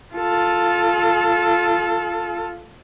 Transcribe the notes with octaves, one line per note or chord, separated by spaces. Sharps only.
F4 A4